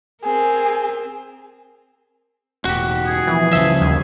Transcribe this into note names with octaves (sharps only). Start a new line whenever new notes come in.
C4 G#4 A#4
E1 A2 F#4 G4
G#4
B2 E3 F3
C#2 G2 C#3 F3 E5
D#2